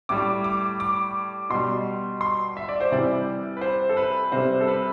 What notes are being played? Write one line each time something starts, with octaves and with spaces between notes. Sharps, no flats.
A2 G3 D6
D6
D6
B2 G3 C6
C6
E5
D5
C5
C3 E3 G3 D5
B4
C5
A4
B4
C3 G3 C5
A4
B4